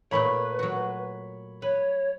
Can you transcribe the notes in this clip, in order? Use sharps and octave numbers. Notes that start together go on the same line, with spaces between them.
A#2 A3 A#3 B4 C#5 B5
F#3 F#4
B4 C#5